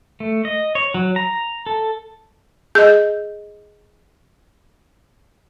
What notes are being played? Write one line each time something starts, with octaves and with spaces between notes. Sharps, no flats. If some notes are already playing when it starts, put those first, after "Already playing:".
A3
D#5
C#5
F#3
A#5
A4
G#4 D#5 G6